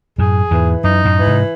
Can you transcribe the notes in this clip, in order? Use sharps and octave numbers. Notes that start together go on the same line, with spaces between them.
F#2 A2 G#4
E2 G#2 E3
F#2 D#4
F#2 A2
E3
G#2 C3